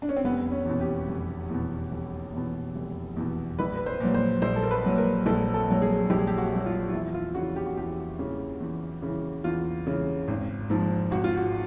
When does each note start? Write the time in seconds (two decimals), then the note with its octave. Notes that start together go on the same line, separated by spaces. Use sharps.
0.02 D4
0.09 C#4
0.16 C4
0.24 F1 B3
0.52 C#4
0.66 E2 B2
0.81 G4
1.08 F1
1.50 E2 B2
1.92 F1
2.33 E2 B2
2.76 F1
3.17 E2 B2
3.59 A#1 B4
3.76 B4
3.86 C5
4.00 A#2 F#3
4.14 C5
4.42 A#1 C5
4.56 A4
4.63 A#4
4.71 B4
4.84 A#2 F#3
4.98 A#4
5.26 A#1 A4
5.54 A4
5.68 A#2 F#3
5.82 G#4
6.10 A#1 G4
6.19 G#4
6.27 G4
6.38 F#4
6.52 A#2 F#3
6.66 F4
6.89 F4
6.93 E2 E4
7.14 F4
7.35 C#3 E3 F#4
7.56 G4
7.66 F#4
7.77 E2 G4
8.19 C#3 E3
8.61 E2
9.02 C#3 E3
9.44 E2 F4
9.87 C#3 E3
10.28 G#1
10.70 G#2 F3
11.11 G#1 F#4
11.24 F4
11.37 F#4